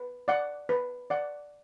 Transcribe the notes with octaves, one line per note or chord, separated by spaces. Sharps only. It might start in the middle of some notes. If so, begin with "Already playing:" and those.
Already playing: B4
D5 F#5
B4
D5 F#5